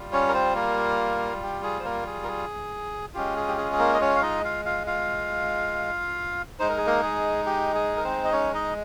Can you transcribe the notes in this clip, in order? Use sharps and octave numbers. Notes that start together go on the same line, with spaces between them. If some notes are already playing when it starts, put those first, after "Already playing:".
Already playing: G3 F4
C#4 C#5
A#4
C4 C5
A#3 A#4
G4
G#4
C5
A#3 A#4
G#4
A#4
G#4
G#3 C#4 F4 G4
G#4
G4
G#4
G#4
A#3 A#4
D#5
C#4 C#5
F5
D#4 D#5
F4 F5
F4 F5
F4 F5
G#3 D#4 C5
A#4
G#4
A#3 A#4
G#4
G4
G#4
A#4
C4 C5
D#5
C#4 C#5
D#4 D#5